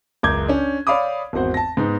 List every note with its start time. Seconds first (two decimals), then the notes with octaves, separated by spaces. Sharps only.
0.23 F#1 C#2 A#5 D6 G6 G#6
0.48 C#4 D4
0.87 C#5 D5 F5 B5 D6 D#6
1.33 G#1 E2 F#4 C5 F#5
1.54 A5 A#6
1.77 G#2 B3 D#4